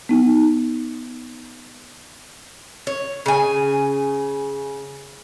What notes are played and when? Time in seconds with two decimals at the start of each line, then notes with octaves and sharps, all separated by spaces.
0.09 B3 D#4
2.87 C#5
3.26 C#3 G#5